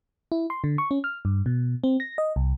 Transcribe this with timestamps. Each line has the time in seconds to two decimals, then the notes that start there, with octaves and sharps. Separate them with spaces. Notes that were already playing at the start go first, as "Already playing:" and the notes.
0.32 E4
0.50 C6
0.64 D3
0.78 C#6
0.91 C#4
1.04 F6
1.25 G2
1.46 B2
1.84 C4
2.00 A#6
2.18 D#5
2.36 C2